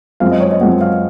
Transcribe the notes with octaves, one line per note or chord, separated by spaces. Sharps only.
F#2 F3 G#3 C4 F5
D#5
C#5
D#5
F#2 F3 G#3 C4 F#5
F5